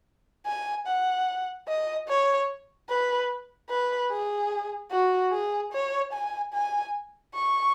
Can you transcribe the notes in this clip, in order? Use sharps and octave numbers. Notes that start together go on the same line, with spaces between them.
G#5
F#5
D#5
C#5
B4
B4
G#4
F#4
G#4
C#5
G#5
G#5
C#6